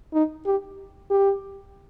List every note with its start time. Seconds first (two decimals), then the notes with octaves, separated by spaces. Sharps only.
0.14 D#4
0.46 G4
1.11 G4